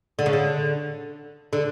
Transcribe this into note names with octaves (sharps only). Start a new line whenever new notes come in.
D3
C#3
D3
D3